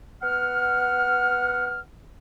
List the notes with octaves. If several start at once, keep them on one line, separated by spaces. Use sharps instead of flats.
B3 F#5 F6